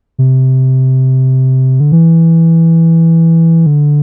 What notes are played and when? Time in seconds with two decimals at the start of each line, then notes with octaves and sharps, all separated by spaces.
0.19 C3
1.80 D3
1.92 E3
3.66 D3